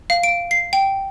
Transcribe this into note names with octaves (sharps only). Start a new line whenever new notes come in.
F5
D7
C7
G5